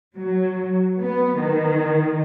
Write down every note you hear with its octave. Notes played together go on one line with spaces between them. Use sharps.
F#3
B3
D#3